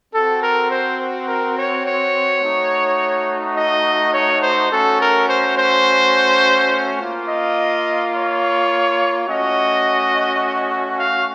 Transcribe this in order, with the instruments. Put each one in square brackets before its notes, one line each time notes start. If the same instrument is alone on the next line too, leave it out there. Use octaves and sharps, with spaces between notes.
[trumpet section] C4 F#4 A4
A#4
C5
A#4
C#5
C#5
A3 D#4 F#4
D#5
C#5
C5
A3 C#4 F#4 A4
A#4
C5
C5
A#3 F4
D#5
C#5
A3 C#4 F#4 D#5
F5